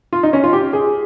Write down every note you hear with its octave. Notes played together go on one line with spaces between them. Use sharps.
F4
D#4
C#4
F4
G4
G#4